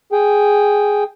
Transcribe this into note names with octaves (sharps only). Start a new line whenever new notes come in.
G#4 G5